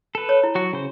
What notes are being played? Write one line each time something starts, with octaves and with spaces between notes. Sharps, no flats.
A4 B4
C#5
E4
F#3 F#4
C#3 C5